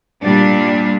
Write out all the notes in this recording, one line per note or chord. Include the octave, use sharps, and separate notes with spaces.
A#2 G3 D4